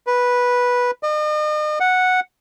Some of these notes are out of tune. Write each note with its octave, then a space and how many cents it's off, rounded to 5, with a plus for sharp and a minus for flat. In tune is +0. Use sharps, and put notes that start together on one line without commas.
B4 -10
D#5 -40
F#5 -5